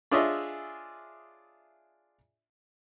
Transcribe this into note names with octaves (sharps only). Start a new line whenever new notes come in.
D4 F4 G#4 C#5 D#5 E5